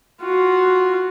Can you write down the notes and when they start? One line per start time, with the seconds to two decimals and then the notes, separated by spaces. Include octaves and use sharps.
0.21 F4 F#4